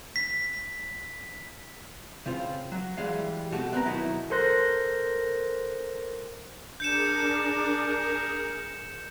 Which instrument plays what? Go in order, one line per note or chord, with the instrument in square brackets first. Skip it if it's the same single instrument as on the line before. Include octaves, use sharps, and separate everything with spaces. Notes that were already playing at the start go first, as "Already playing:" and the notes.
[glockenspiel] B6
[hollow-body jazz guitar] C#3 C4 F4 C5
F#3
E3 G3 G#3 F5
B2 G3 A3 C4 F#4 G4
B3 C4 A#4 B4 A#5
B2 D#3 F#3 D#4 E4
[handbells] A4 A#4 C5 C6 F#6 A#6
[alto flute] D4 [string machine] G#4 A#4 [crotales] G6 C#7 E7